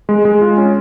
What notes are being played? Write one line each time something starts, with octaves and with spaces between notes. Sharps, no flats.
G#3
G#3
F4
C#4